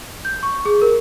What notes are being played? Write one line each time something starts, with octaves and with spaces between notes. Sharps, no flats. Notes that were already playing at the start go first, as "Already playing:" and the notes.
G6
C#6
G#4
A#4